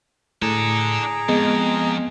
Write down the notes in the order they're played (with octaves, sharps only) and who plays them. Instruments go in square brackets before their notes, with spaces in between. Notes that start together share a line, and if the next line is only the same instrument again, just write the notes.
[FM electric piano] A2 [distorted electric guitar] D4 A4 [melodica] G#4 A#5
[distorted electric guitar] F2 [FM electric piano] G#3 [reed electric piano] B3 D#5